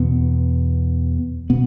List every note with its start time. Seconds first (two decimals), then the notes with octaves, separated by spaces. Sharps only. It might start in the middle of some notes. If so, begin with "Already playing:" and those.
Already playing: E2 B2 B3
1.50 B2 B3